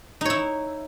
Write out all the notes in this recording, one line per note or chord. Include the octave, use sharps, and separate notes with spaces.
D#4 E4 C#5